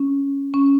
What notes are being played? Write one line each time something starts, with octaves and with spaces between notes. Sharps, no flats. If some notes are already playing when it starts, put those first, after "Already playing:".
Already playing: C#4
C#4